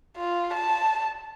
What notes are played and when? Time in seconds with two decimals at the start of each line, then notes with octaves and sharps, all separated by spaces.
0.17 F4
0.54 A5